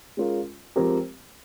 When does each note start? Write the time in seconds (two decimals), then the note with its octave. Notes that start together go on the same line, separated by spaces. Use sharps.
0.17 G#3 C#4 F4 A#4
0.76 F3 G#3 C4 G4 A#4